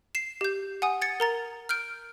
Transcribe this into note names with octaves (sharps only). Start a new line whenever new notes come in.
C7 E7
G4 G6
F#5 G#5 D#6
G#6 A6 C#7
A#4 A#5 A6
F6 G6 D7